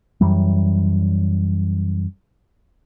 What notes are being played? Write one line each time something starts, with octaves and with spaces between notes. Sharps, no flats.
F#2 E3 F#3 G3